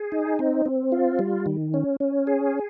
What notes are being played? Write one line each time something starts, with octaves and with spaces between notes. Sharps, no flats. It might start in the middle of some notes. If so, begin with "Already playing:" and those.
Already playing: G#4
D#4
C4
C4
F4
G3
D#3
C#4
C#4
G#4